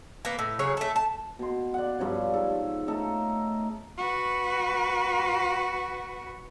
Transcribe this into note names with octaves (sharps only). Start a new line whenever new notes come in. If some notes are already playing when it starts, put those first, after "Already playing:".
A#3 B3
A2
C#3 F#3 G#4 C#5
A3 A4
A5
B2 C6
D5 F#5
G2 F3 A4 C#5
G#2 A4
A3 D#4 A4 A#4
F#4 B4